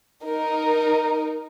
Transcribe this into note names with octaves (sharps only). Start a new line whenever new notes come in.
D#4 A#4